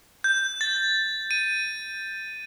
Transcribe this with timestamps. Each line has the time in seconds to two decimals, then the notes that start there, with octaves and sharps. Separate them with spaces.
0.24 G6
0.61 A6
1.31 D#7